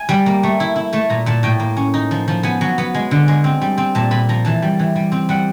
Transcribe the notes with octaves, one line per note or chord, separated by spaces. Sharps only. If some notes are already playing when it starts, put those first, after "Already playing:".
Already playing: G#5
G3
A#3
A3
E4
E4
A3 A5
A#2 A#5
A#2 A5
A2 G5
A#3
C#4
D#4
F3
F3
B3 G#5
F#3
B3
G#3
D3
G#3
C4
G3
C4
A#2 A5
A#2 B5
F3 A#5
E3 A5
G3
E3
G3
C4
G3 F#5